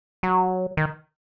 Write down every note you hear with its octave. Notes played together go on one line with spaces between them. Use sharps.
F#3
D#3